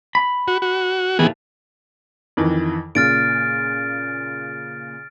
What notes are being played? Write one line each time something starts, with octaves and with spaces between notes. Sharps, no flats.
B5
F#4
F#4
D#2 A2 E3 B3 G#4
F2 D#3 E3
A#2 C#3 F6 A6 D7